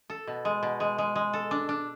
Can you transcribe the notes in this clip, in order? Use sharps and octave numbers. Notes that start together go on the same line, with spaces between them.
A4
B2
G#3
B2
G#3
G#3
G#3
A4
D4
D4